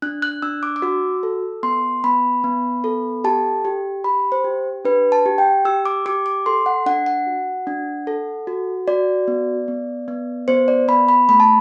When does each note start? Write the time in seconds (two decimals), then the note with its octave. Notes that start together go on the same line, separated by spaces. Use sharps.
0.02 D4 F#6
0.22 F#6
0.42 D4 E6
0.63 D6
0.76 D6
0.82 F#4 E6
1.23 A4
1.63 B3 C6
2.04 B3 B5
2.44 B3
2.84 A4
3.24 G4 A5
3.65 G4
4.04 G4 B5
4.32 C5
4.44 G4
4.85 D4 B4
5.12 A5
5.26 G4
5.38 G5
5.65 G4 E6
5.85 D6
6.06 G4 D6
6.26 D6
6.46 A4 C6
6.66 F#5
6.86 D4 F#5
7.06 F#5
7.27 F#4
7.67 D4
8.07 A4
8.47 F#4
8.87 F#4 D5
9.28 B3
9.68 B3
10.08 B3
10.48 B3 C5
10.68 D5
10.88 B3 B5
11.09 B5
11.29 A3 B5
11.40 A5